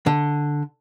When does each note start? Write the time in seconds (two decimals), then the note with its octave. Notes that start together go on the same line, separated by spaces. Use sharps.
0.06 D3